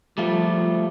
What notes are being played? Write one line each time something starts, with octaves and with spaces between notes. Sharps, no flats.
F3 G3 A3 F4